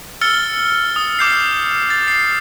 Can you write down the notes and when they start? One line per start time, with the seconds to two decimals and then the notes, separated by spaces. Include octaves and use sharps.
0.21 E6 F6 A6 C#7 G7
0.96 D#6
1.19 D6 G6 C7
1.90 A6
2.08 C7